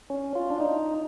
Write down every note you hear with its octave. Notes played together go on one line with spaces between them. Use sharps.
C#4
F4
D4
D#4